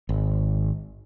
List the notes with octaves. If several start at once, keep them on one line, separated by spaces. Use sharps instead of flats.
G#1